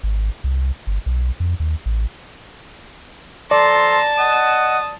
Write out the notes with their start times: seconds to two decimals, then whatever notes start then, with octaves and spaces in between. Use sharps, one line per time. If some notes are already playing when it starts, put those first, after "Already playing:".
0.03 G#1
0.44 C2
0.87 G1
1.06 B1
1.40 F2
1.60 D#2
1.86 A1
3.51 F3 A4 D5 A5 A#5 C6
4.18 D#5 F#5 D#6